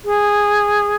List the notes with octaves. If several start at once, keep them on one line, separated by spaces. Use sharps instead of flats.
G#4